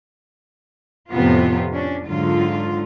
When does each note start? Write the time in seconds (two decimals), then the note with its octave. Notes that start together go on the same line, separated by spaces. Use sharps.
1.10 F2 A2 C3 B3 C4 F4
1.72 C#4 D4
2.07 G#2 D3 F#3 F4